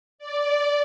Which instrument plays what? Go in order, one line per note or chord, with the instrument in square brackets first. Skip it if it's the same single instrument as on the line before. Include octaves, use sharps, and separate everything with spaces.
[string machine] D5